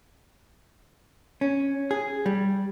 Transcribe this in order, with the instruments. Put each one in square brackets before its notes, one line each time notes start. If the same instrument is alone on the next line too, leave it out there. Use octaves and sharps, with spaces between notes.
[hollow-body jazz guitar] C#4
G#4
G3